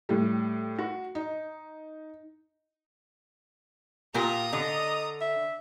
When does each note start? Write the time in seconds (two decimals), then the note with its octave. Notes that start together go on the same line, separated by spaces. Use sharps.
0.09 A2 G3
0.78 F#4
1.15 D#4
4.14 A#2 F4 G4 A#4 A#5 D#6
4.53 D3 D#5
5.21 E5